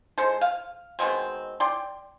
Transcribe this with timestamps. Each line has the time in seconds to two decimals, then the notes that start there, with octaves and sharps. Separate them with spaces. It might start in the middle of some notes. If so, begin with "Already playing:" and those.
0.18 G#3 A4 C5
0.41 F5
0.99 B2 D#3 G#3 C4
1.60 D5 G5 C6